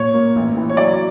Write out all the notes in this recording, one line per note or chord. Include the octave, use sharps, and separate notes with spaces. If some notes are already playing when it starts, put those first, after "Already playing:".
Already playing: A#2 C#5
A#3
A1
E3
C#5
F#3 D5